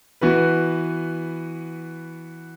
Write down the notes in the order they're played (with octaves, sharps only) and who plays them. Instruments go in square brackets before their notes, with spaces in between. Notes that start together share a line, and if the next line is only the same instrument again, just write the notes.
[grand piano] E3 B3 F#4 B4